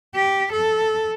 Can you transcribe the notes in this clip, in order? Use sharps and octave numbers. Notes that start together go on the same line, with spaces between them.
G4
A4